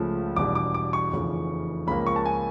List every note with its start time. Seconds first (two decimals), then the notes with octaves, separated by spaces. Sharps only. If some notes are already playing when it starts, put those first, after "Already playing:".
Already playing: C#2 C#3 F3 A3
0.36 E1 E2 B2 G3 D6
0.55 D6
0.74 D6
0.93 C#6
1.12 F1 E2 C#3 F3
1.87 C#2 C#3 F3 A#3 B5
2.07 C#6
2.16 A5
2.26 G#5